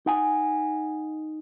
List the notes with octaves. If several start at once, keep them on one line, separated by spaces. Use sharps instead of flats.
D#4 F#5 G#5